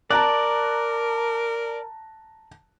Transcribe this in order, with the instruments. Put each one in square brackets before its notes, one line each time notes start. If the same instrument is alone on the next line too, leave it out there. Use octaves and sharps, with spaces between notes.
[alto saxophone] A#4 [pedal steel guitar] D5 [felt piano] A5 A#5 F#6